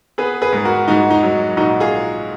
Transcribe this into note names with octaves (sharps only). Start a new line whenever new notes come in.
B3 G#4 B4
G#4 B4
G#2
F#4 A#4
G#2 D#4 F#4
D#4
F#3
A#1 D#4 F#4
F4 G#4